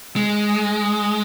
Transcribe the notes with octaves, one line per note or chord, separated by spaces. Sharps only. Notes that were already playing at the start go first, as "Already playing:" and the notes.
G#3